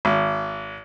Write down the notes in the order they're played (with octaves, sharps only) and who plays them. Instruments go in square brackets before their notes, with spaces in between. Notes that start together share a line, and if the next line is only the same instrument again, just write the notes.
[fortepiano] G#1